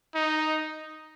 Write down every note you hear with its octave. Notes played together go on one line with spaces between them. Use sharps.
D#4